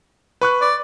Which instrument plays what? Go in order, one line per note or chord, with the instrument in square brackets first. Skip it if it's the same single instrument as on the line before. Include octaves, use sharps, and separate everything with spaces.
[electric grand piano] B4 C#6 F#6
[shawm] D5